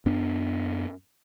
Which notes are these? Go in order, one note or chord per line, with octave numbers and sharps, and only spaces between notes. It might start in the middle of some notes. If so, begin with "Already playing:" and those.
F#2 B3 D4